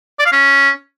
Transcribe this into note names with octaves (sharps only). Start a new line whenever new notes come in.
D5
F5
C#4